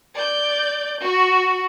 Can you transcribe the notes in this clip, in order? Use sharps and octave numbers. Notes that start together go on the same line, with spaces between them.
D5 G6
F#4